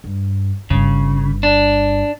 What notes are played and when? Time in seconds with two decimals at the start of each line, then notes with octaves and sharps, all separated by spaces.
0.04 G2
0.70 G1 G2 C#3
1.43 D4